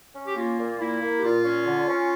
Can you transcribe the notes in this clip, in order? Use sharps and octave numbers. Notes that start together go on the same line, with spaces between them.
C#4
G4
A#3 F4
A#2
A#3 E4
A#3
G4
A#2 F4
C#4
D3
C#4